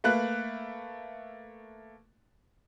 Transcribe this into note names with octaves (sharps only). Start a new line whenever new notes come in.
A3 A#3 B4 F#6